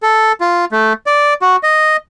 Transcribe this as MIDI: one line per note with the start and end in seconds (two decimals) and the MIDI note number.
0.03 0.32 69
0.40 0.65 65
0.72 0.93 57
1.06 1.34 74
1.42 1.56 66
1.63 1.97 75